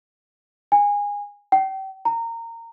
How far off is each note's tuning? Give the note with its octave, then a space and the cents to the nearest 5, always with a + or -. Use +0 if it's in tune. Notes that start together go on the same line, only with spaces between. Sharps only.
G#5 -25
G5 -35
A#5 -20